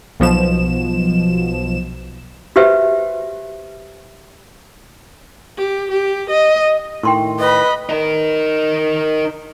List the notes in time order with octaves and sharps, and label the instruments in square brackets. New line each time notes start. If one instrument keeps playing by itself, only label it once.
[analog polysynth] B1 B2 F3 E7
[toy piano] F#4 G4 B4 C5 E5
[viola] G4
G4
D#5
[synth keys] A2 D#3 [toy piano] G5 C6 C#6
[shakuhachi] B4 [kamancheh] D#5 B5
[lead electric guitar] D#4 A#4